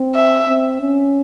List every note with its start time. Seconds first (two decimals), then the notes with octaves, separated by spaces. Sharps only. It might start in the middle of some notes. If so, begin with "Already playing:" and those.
Already playing: C4
0.15 E5
0.48 C4
0.81 C#4